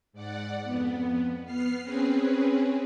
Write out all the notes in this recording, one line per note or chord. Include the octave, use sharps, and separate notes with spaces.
G#2 D5 F#5
F2 B3
B3 F6 C7
C4 C#4 G#4 B4